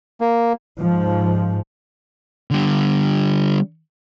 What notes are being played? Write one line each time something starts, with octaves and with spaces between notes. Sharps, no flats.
A#3
G#2 F3
D3 G3